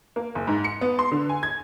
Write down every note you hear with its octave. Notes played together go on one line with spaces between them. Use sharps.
A#3
F#1
G#2
C#7
B3
C6
D3
G#5
G#6